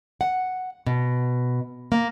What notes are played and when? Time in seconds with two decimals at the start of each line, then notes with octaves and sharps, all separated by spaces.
0.21 F#5
0.86 B2
1.92 A#3